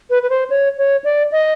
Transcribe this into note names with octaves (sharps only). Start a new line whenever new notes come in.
B4
B4
C5
C#5
C#5
D5
D#5